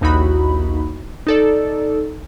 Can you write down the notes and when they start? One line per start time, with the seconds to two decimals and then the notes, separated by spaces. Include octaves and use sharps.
0.01 A#1 D#2 D#4 E4 F#4 B5
1.27 D#4 A4 D5